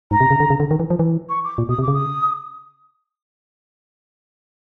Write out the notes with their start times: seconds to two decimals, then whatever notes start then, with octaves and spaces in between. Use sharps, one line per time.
0.11 G#2 A#5
0.20 C3
0.31 C#3
0.40 D3
0.50 C#3
0.60 D3
0.71 D#3
0.80 E3
0.90 F3
0.99 E3
1.29 C#6
1.44 D6
1.58 A#2
1.69 B2 D#6
1.79 C3
1.82 D6
1.88 C#3
1.94 D#6